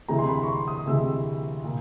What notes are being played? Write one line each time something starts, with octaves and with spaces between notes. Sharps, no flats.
D2 C3 E3 G#3 A#5
C6
B5
C#6
C6
D#6
D2 C3 E3 G#3 E6
A#2